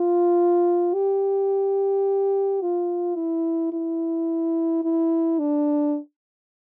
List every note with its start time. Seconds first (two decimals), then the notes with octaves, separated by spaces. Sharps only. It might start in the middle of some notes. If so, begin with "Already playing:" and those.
Already playing: F4
0.94 G4
2.61 F4
3.16 E4
3.72 E4
4.84 E4
5.39 D4